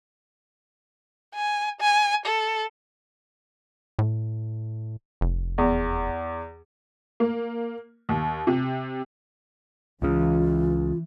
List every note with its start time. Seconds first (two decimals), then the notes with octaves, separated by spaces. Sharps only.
1.35 G#5
1.81 G#5
2.26 A4
3.99 A2
5.21 F1
5.58 E2
7.20 A#3
8.09 D#2
8.47 C3
10.02 C#2 C#3 E3 F4